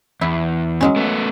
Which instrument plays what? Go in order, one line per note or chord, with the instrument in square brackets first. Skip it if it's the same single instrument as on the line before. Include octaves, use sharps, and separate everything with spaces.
[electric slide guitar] E2 [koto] E4
[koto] F#3 G#3 C#4
[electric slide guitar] A3 B3